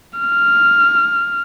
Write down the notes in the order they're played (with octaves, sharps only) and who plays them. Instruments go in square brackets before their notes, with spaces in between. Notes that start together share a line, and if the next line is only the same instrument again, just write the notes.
[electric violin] F6